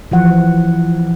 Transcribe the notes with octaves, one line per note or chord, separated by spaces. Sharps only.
E3 F3 F#5